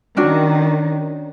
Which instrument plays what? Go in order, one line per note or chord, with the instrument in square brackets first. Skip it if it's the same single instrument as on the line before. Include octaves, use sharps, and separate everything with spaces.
[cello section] D#3 [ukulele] C#4 D4 F#4